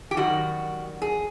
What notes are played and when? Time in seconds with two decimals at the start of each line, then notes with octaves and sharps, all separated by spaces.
0.11 G4
0.16 F#2 D#3 G3 F#4
1.02 G#4